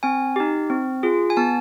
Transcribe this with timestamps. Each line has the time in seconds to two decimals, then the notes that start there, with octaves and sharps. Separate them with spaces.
0.03 C4 G#5
0.36 D#4 G4
0.70 C4
1.03 F4 G#4
1.30 G#5
1.37 B3 A5